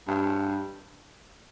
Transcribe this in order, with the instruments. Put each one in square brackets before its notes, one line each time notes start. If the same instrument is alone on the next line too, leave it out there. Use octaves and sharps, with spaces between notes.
[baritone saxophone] G2